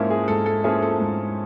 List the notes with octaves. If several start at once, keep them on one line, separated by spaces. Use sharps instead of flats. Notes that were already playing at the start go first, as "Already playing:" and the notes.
Already playing: G#2 F3 A#3 C#4 E4 A#4
G#4
G#2 A4
A4
F3 A#3 C#4 E4 G#4
A4
G#2